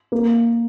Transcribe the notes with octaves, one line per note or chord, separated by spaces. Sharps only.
A#3